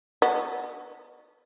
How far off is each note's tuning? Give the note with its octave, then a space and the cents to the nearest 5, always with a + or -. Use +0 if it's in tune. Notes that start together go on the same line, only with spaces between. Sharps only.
B3 +0 F#4 +0 D#5 -45